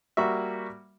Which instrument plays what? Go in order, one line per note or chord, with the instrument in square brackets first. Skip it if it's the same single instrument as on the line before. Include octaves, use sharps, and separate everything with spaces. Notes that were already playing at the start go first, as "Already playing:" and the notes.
[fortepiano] G3 A#3 F#4 E5